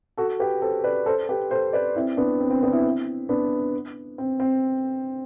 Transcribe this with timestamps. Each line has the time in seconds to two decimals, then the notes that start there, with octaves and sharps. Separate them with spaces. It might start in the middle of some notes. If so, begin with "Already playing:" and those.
0.17 F#4 A4
0.39 G4 B4
0.62 A4 C5
0.84 B4 D5
1.06 A4 C5
1.29 G4 B4
1.51 A4 C5
1.73 B4 D5
1.96 C4 E4
2.17 B3 D4
2.40 C4
2.51 C4
2.63 B3 D4
2.73 C4 E4
3.29 B3 D4
4.18 C4
4.40 C4